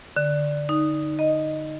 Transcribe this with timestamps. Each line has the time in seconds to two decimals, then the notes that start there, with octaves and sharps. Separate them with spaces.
0.16 D3
0.69 D#4
1.19 D#5